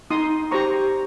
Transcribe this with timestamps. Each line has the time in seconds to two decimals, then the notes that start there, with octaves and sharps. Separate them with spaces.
0.10 D#4 C6 D#6
0.51 G4 C5 A#5 C#6